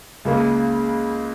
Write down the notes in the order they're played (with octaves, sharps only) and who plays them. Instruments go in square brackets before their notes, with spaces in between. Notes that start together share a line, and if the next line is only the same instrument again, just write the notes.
[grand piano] C#2 C#3 A#3